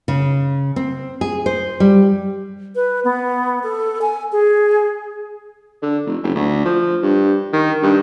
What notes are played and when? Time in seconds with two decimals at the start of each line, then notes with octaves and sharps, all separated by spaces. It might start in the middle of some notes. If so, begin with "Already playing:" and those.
0.08 C#3
0.76 C4
1.21 G#4
1.46 C5
1.80 G3
2.76 B4
3.04 B3
3.63 A4
4.02 G#5
4.32 G#4
5.82 D3
6.06 F1
6.23 F#1
6.36 D2
6.65 F3
7.03 G2
7.53 D#3
7.82 G2